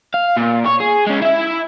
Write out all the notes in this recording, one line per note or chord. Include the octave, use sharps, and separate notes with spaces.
F5
A#2
C#5
G#4
G#3 C#4
E4 E5